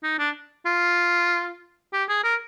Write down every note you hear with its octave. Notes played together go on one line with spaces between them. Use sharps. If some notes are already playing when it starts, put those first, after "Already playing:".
D#4
D4
F4
G4
G#4
A#4